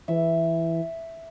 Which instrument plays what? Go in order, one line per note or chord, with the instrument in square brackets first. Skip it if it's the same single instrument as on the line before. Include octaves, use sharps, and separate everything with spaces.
[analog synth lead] E3 [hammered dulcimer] E5